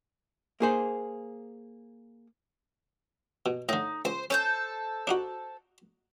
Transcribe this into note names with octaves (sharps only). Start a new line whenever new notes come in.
A#3 G#4 C5
B2
A2 D3 D#4
C#2 C5
C#4 A4 C5 G6
D4 D#4 F#4